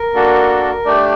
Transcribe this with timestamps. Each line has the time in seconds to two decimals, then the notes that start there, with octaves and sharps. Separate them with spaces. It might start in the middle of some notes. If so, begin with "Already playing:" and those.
Already playing: A#4
0.14 A#3 D4 F#4 A4
0.85 A3 D4 G4 D5